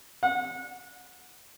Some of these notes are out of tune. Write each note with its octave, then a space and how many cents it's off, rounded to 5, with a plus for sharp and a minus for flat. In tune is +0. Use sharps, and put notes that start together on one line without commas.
F#5 -30